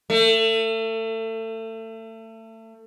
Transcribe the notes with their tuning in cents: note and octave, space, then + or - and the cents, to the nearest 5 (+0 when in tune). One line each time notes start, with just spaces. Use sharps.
A3 +30